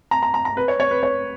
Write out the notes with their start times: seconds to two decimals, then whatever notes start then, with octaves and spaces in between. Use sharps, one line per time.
0.11 A#5
0.23 A#5
0.34 A#5
0.45 A#5
0.57 B4
0.68 C#5
0.80 C#5
0.91 B4
1.03 C#5